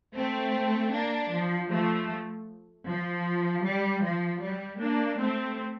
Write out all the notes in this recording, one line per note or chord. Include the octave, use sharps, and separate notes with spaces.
A3 C4
A#3 D4
F3
F3 A3
F3
G3
F3
G3
A#3 D4
A3 C4